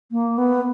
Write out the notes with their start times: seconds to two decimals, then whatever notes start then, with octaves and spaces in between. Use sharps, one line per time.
0.11 A#3
0.38 B3